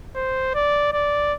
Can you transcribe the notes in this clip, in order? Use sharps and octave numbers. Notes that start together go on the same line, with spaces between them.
C5
D5
D5